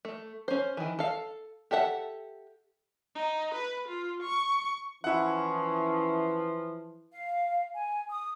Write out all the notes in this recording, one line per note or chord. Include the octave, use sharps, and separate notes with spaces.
A3
C#4 C5
D#3 E3
A4 F5
G4 A4 E5 F#5
D#4
B4
F4
C#6
E3 F3 C#4 E4 F#5
F5
G#5
D#6